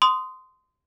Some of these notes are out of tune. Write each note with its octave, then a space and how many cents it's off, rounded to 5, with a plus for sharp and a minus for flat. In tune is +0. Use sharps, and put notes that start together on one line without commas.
C6 -20 D#6 +0